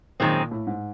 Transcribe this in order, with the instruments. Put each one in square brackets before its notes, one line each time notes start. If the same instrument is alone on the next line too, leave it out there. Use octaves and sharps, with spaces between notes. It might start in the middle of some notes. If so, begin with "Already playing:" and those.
[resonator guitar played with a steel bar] F#2 D#3 G#3 C4 [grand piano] A#2
[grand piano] A2
G#2